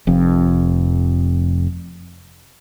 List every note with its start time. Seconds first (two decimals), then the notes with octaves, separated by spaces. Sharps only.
0.07 F1 F2